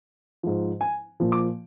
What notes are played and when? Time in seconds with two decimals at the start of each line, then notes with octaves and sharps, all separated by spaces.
0.43 G#2 F3
0.81 G#5
1.20 A#2 F3
1.32 D6